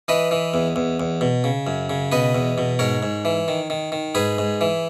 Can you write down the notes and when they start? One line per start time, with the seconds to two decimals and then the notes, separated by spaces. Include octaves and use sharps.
0.08 E3 B4 D#5
0.31 E3
0.54 E2
0.76 E2
1.00 E2
1.21 B2
1.44 C#3
1.67 F#2
1.90 C#3
2.12 B2 B4 D#5
2.35 E2
2.58 B2
2.79 G#2 A#4 C#5
3.03 G#2
3.25 E3
3.48 D#3
3.70 D#3
3.92 D#3
4.15 G#2 G#4 B4
4.38 G#2
4.61 E3